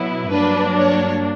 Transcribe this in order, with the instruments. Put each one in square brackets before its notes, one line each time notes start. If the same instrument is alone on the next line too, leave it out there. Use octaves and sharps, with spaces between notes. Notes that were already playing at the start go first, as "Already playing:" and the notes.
Already playing: [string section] B2 F#3 B3 E4
G2 F#3 A#3 D4 B4
C#5